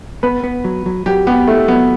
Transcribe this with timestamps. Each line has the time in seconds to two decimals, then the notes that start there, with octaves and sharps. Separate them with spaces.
0.23 B3 B4
0.44 B3
0.64 F#3
0.86 F#3
1.06 F#3 G4
1.27 B3 G4
1.47 A3 E4
1.68 F#3 B3